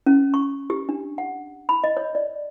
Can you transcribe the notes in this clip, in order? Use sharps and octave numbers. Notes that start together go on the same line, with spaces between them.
C#4
C#6
G4
D4
F#5
B5
D#5
C#5
D5